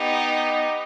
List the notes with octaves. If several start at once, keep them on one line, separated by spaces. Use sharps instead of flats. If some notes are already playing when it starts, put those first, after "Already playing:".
Already playing: B3 D#4 G4